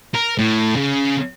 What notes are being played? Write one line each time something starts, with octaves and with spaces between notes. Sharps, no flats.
A#4
A2
C#3